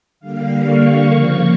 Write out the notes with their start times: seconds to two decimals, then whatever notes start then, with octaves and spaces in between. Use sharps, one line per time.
0.20 D3 G3 A#3 F5
0.64 C#6
1.07 C#3 F3 A#3